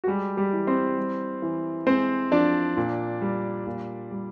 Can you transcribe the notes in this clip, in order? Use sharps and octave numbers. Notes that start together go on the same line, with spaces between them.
F#4
G3 G#3 G4
G3 G4
E3
C4 C5
G3
E3
G#3 C4 C5
F3 D4 D5
A#2
G3
A#2
G3